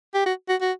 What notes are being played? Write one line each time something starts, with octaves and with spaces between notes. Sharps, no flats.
G4
F#4
F#4
F#4